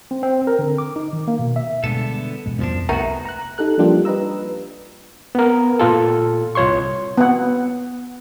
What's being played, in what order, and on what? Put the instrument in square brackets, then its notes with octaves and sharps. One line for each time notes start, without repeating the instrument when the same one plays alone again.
[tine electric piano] C4
C4
A#4
D3
D6
D#4
D#3
A#3
B2
E5
[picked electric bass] B2 G3 G#3 [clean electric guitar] D3 B3 A4
[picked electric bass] E2 B2 G#3
[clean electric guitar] C2 F3 D4 [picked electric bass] F2 A#3 B3
[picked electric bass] C2 [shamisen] A3 B3 A#4 [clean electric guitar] D#4 F#4
[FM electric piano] A#5 F#6
D#4 G4 A4 F#6
F3 G3 A#3 D4 F4 G4
B4 D#5 A#5 E6
[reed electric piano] B3 A#4
A#2 F4 A4
C2 F4 C#5 C6 C#6
[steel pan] B3 F#5